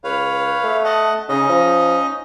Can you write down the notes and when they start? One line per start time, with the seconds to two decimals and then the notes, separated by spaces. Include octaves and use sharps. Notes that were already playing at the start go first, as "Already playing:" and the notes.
0.04 C#2 B4 C#5 F5
0.64 A3
0.84 D#5 F#5 A5
1.29 C#3 C#4 D#4 D#5
1.49 F3